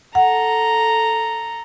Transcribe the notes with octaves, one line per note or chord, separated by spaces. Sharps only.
A4 F#5 A#5